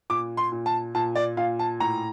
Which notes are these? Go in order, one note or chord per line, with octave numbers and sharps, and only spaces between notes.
A#2 D6
C6
A#2
A5
A#2 A5
D5
A#2 F5
A5
A2 A#5